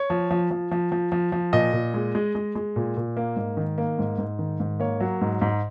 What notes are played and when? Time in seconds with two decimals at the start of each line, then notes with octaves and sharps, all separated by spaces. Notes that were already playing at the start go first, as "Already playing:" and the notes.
Already playing: C#5
0.10 F3
0.30 F3
0.51 F3
0.71 F3
0.92 F3
1.12 F3
1.32 F3
1.53 A#2 D#5
1.73 A#2
1.94 G#3
2.15 G#3
2.35 G#3
2.55 G#3
2.76 A#2
2.97 A#2
3.17 A#3
3.36 G#2
3.57 D#3
3.78 A#3
3.99 G#2
4.18 G#2
4.39 D#3
4.60 G#2
4.80 A#3 C#5
5.00 F#3
5.21 G#2
5.41 G#2